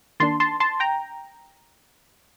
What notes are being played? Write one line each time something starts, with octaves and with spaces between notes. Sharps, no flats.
D#3 A#3 D4 A5 C6
A5 C6
A5 C6
G5 A#5